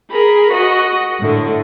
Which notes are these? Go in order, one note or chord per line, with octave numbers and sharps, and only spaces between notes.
G#4 A#4 B5
F#4 D#5
A2 D3